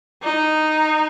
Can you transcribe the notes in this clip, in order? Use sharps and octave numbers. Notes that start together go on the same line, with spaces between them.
D#4